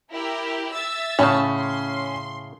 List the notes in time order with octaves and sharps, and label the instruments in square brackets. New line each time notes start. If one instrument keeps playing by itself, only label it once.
[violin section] E4 G4 A#4
E5 E6 A6
[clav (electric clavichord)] A2 C#3 [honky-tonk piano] C#4
[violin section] C6